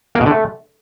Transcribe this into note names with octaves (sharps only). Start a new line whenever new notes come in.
A#3
B2
D3
A3